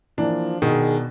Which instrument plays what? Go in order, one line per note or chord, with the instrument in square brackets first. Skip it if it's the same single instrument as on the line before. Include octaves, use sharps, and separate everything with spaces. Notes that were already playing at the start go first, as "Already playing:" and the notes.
[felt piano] E3 A#3 [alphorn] F3 [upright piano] D4
[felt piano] B2 [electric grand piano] D#3 [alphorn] G#4